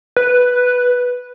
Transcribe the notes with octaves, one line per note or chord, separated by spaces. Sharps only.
B4